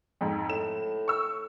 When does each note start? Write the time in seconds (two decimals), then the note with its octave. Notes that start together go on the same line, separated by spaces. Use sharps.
0.21 F2 G#2
0.50 A2 E7
1.08 C#6 E6